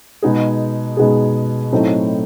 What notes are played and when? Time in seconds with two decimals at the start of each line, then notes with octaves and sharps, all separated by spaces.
0.22 B2 G#3 B3 D#4 G#4
0.97 B2 G#3 B3 D#4 G#4
1.72 A2 F#3 A3 C4 D#4